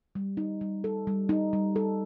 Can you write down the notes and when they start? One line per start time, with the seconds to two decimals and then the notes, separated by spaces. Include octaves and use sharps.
0.15 G3
0.37 D#4
0.61 G3
0.84 A4
1.07 G3
1.29 D#4
1.53 G3
1.76 A4